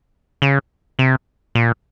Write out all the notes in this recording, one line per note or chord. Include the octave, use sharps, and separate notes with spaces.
C#3
C3
A#2